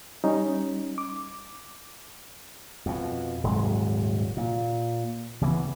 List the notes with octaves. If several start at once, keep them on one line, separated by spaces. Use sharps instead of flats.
G3 C#4 D#4
D6
F2 B2
D#1 G#2 C3 F#3
A#2
C#3 E3 A#3 B3